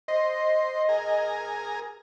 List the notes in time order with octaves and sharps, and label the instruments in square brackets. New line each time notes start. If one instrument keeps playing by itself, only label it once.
[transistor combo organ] C5 [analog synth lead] D#5
[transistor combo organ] G#4 A#4